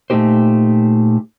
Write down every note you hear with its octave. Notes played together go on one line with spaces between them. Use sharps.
A#2 A3 B3 D#4 G4 C5